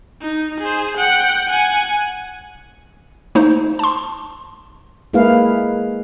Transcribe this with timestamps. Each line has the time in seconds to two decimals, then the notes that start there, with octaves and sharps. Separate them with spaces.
0.21 D#4
0.60 G#4 C5
0.97 F#5 G5
1.49 F#5 G#5
3.35 A3 A#3 D#4 C5
3.79 A5 C6
5.13 G#3 A#3 E4 G#4 B4 F5